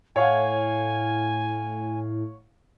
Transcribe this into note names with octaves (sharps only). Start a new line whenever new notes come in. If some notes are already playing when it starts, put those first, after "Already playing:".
A2 C#5 F5 F#5 G#5